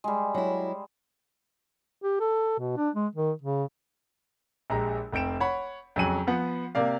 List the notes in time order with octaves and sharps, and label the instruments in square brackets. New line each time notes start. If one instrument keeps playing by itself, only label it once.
[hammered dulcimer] G3 G#3
[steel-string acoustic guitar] F#3 E4
[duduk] G4
A4
B2
D4
G#3
D#3
C#3
[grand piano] A#1 G#3 G4 A#5
F1 C4 G5 D7 E7
C#5 F#5 B5
F2 C#3 F#3 G#5 D#7 F#7
F3 B3 F#5
C3 A#3 D5 F5